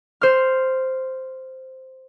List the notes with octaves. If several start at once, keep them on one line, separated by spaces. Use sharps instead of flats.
C5 F6